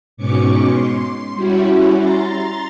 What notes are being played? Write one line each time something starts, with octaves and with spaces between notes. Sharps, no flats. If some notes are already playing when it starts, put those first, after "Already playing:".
G#2 B2 C#4 C#6 D6 C#7
C6
G3 C#4 E4 F#4
A#5 C6 A6